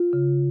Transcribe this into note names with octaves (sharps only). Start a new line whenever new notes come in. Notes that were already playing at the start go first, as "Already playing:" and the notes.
Already playing: F4
C#3